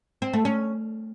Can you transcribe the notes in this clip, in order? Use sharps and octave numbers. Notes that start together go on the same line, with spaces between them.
C4
A3
C#4